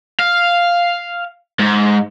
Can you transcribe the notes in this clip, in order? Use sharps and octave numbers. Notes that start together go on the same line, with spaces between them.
F5
G#2